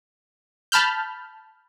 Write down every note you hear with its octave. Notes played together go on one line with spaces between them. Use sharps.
A5 B5 F6 G6